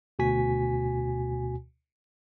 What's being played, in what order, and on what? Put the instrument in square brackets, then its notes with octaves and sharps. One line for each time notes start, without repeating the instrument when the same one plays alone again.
[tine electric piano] D2 B2 F#4 G#5 B6